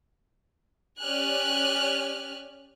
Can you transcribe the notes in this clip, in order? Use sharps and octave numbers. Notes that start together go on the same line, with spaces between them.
C#4 G4 D5 G#5 F6 F#6